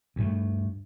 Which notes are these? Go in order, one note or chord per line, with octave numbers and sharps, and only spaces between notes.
D2 G2 A3